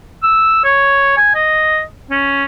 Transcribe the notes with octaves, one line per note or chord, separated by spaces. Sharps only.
E6
C#5
G#5
D#5
C#4